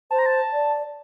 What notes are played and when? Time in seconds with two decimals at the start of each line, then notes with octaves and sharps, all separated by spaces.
0.11 C5 A5
0.19 A#5
0.26 A5
0.53 D5